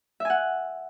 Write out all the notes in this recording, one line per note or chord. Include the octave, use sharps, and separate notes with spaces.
E5 F#5 G#5